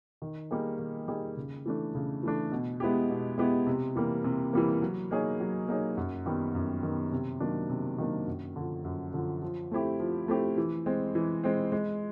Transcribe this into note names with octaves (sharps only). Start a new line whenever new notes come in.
D#3
G3 A#3 D#4 G#4
D#3
G3 A#3 D#4 G#4
C#3
E3 A3 D4
C#3
E3 A3 D4
B2
G#3 B3 E4 G4
B2
G#3 B3 E4 G4
C3
E3 G3 A#3
C3
E3 G3 A#3
F#3
A#3 D#4 G#4 C#5
F#3
A#3 D#4 G#4 C#5
F#2
D#3 G3 B3
F#2
D#3 G3 B3
C3
D#3 F#3 A#3 D4
C3
D#3 F#3 A#3 D4
F#2
D3 F3
F#2
D3 F3
F3
A3 C4 E4 G4
F3
A3 C4 E4 G4
E3
G#3 C4
E3
G#3 C4
G#3